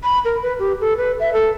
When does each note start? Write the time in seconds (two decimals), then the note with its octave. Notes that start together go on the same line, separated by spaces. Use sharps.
0.03 B5
0.25 A#4
0.42 B4
0.59 G4
0.81 A4
0.97 B4
1.20 E5
1.33 A4